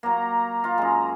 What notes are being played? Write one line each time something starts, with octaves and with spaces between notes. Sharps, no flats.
F#3 A#3 A#5
F4
F#2 G#3